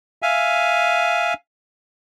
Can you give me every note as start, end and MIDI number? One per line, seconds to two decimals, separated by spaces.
0.22 1.34 76
0.22 1.34 77
0.22 1.34 80